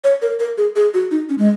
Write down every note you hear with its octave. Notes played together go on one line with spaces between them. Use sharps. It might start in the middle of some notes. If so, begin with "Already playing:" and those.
C#5
A#4
A#4
G#4
G#4
F#4
D#4
C#4
G#3